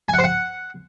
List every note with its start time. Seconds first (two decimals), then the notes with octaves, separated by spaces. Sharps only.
0.09 G#5
0.14 F#5
0.19 C5
0.24 F#5